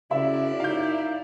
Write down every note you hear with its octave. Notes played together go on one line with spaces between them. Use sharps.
F#2 C#3 E4 D5 E5
D#4 F5 G6